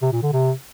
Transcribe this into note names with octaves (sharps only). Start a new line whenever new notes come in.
C3
A#2
D3
C3